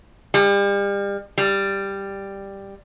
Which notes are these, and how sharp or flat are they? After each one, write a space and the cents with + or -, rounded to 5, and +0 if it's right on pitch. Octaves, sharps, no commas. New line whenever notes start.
G3 +35
G3 +5